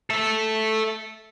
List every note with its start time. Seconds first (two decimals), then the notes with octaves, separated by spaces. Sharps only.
0.10 A4 E5